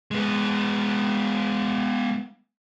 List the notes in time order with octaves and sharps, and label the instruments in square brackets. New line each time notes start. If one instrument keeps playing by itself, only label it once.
[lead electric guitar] G#3 B3